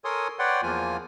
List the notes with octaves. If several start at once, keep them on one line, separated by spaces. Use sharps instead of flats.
A4 A#4 C#5 G#5 C6 D#6
B4 C#5 D5 F#5 G5 C6
E2 F3 A#3 F4 G#5